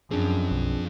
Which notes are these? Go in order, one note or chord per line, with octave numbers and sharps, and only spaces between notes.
F#2 F3 C4 D4 G#4
B1